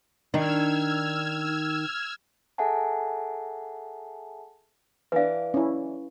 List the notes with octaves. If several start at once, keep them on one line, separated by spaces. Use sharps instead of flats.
D#3 D4 D#4 E6 F6 G#6
G#4 A4 E5 F#5 G#5 A5
E3 D4 B4 F5
C#4 E4